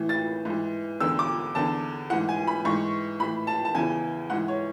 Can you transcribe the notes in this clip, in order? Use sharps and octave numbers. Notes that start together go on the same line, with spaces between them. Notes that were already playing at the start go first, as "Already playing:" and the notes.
Already playing: A2 E3
A6
G#2 E3
E2 D3 E6
D6
E2 D3 A5
G#2 E3 F#5
G#5
B5
G#2 E3 C#6
A2 E3 B5
A5
A5
E2 C#3 E3 G#5
G#2 E3 F#5
C#5